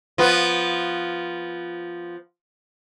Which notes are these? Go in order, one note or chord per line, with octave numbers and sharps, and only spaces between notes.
F3 B3